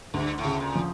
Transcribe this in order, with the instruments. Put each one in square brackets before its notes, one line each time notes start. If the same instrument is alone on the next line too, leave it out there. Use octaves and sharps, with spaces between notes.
[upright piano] D2 [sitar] G2
[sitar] A2
[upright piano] C#3
[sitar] A#2
[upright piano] F3